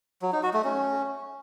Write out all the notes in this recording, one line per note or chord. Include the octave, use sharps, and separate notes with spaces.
F#3
D#4
F#4
A3
C#4